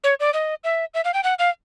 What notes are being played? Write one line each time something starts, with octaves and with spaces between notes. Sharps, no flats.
C#5
D5
D#5
E5
E5
F5
G5
F#5
F5